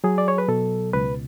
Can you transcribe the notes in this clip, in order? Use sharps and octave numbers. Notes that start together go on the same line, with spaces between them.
F#3 G#4
D5
C#5
B4
B2 A4
C#2 B4